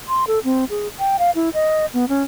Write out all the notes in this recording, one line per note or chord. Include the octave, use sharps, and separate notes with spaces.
C6
A4
C4
G#4
G5
F5
E4
D#5
B3
C#4